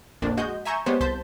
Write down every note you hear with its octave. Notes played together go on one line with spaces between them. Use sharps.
A#1 F2 A#3 D4
G#3 F#4 D#5 G6
E5 G#5 A#5 C#6 G6 E7
G3 G#3 B3 C5 C#5
C2 C5 A5 G6 B6